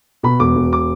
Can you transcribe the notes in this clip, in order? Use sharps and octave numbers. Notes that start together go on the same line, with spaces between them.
B2 B5
E1 D6
E1
D6